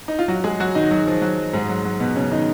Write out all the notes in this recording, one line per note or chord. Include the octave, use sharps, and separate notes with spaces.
D#4
F4
F#3 F#4
G#3 G#4
F#3 F#4
D#3 D#4
F#3
F3
F#3
G#2 G#3
F#3
F#3
B2 B3
C#3 C#4
D#3 D#4